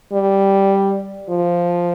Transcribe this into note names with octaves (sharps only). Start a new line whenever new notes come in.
G3
F3